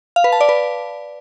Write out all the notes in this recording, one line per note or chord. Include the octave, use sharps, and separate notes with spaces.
F5
B4
A5
D5
B4